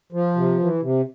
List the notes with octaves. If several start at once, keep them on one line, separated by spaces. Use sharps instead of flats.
F3
C3
E3
C3